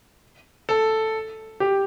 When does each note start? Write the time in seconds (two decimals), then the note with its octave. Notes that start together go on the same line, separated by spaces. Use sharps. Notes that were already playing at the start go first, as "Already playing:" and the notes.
0.69 A4
1.60 G4